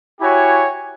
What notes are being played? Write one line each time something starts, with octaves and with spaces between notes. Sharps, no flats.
E4 F#4 G4 C#5 G#5